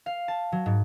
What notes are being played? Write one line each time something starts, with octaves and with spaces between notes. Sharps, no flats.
F5
A5
F#3
G#2